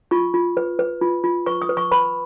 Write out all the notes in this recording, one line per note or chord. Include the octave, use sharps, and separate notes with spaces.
F4 C#6
F4
B4
B4
F4
F4
B4 C#6
D#6
B4
C#6
B4 B5